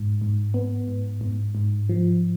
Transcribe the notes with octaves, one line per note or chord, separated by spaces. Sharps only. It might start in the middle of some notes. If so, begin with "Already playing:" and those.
Already playing: G#2
G#2
B3
G#2
G#2
G#2
F3